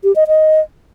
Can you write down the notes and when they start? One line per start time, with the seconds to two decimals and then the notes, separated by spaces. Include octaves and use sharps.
0.04 G4
0.16 D#5
0.28 D#5